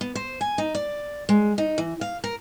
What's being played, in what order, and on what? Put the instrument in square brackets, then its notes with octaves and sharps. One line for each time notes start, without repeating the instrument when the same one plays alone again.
[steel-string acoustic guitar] B3
C5
G#5
D#4
D5
G#3
D#4
E3
F5
A#4